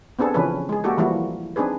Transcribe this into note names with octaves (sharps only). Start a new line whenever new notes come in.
B3 C4 D4 G#4 A4
C#3 E3 F3 C#4 D4 B4
G#3 G#4
A#3 F#4 G4 A4
E3 F3 G3 A#3 E4 F#4
C4 D4 D#4 G#4 B4